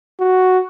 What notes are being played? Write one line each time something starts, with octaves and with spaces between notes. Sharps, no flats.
F#4